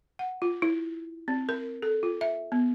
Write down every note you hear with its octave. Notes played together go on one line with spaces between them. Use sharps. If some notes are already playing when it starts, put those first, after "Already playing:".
F#5
F4
E4
C4
A#4
A4
F4
E5
B3